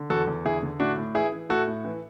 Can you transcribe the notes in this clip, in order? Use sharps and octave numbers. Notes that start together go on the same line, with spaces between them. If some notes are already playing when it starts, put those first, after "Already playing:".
Already playing: D3
E2 F#4 A4
E2
D3 E4 G#4
D3
A2 D4 F#4
A2
E3 E4 G#4
E3
A2 F#4 A4
A2
E3